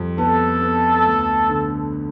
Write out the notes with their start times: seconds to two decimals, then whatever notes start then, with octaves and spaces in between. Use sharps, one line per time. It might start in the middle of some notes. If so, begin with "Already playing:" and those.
Already playing: F2 G3
0.18 B3 A4
0.62 B3
1.05 D2
1.49 D3